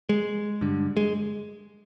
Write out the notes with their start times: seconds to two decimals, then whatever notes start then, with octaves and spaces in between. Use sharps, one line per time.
0.09 G#3
0.61 G2 D3
0.97 G#3